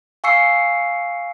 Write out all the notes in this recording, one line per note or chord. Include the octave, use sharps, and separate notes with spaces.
F5 G#5 C#6 E6 C7 C#7